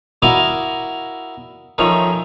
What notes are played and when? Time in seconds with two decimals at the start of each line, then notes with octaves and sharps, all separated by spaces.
0.22 E4 F#4 A#4 D5 D#5 F5
1.78 D#3 F3 A3 C#4